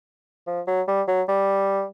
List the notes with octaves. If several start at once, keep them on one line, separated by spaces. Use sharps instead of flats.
F3
F#3
G3
F#3
G3